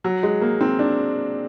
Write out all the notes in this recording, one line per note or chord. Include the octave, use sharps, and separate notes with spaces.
F#3
G#3
A#3
C4
D4